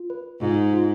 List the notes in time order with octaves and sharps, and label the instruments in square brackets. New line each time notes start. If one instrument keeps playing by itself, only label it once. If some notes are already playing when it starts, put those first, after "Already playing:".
Already playing: [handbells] F4
B4
[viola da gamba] G#2 [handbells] F4
[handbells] F4